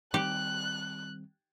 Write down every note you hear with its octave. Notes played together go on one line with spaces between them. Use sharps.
D#3 G3 C4 G4 F#6